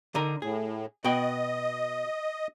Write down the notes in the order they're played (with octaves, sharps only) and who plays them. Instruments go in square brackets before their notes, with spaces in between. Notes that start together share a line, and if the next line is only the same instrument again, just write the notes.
[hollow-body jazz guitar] D3 D#4 A#4
[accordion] A2 [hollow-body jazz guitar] G#4
[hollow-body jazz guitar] B2 F#4 G5 [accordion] D#5